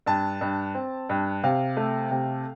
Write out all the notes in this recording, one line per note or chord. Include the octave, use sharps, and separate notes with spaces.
G2 A5
G2
C4
G2
C3 F5
A3
C3